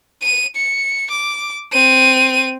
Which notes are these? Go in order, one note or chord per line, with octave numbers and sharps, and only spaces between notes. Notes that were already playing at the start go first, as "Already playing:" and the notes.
D#7
C#7
D6
C4 D#7